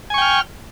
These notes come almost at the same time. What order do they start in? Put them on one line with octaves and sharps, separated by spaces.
G#5 C#6 G5 F6